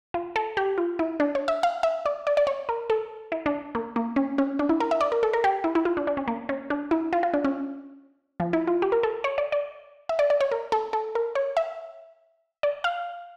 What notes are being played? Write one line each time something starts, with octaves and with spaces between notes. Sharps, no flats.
F4
A4
G4
F4
E4
D4
C#5
E5
F5
E5
D5
D5
D5
C#5
A#4
A4
E4
D4
A#3
A#3
C#4
C#4
D4
E4
A#4
E5
D5
A#4
A4
A#4
G4
E4
E4
F4
D4
D4
C#4
A#3
C#4
D4
E4
F4
F4
D4
C#4
F3
E4
F4
G4
A#4
A4
C#5
D5
D5
E5
D5
D5
C#5
A#4
A4
A4
A#4
C#5
E5
D5
F5